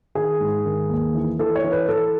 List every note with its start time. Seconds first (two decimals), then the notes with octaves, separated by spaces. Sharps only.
0.15 D#3 G#4
0.40 G#2
0.65 D#3
0.89 D#2
1.14 E3
1.39 E3 A4
1.56 C#5
1.64 E3
1.72 B4
1.89 E3 A4